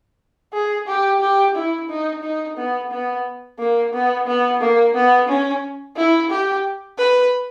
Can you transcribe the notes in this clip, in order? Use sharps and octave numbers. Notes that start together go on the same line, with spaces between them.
G#4
G4
G4
E4
D#4
D#4
B3
B3
A#3
B3
B3
A#3
B3
C#4
E4
G4
B4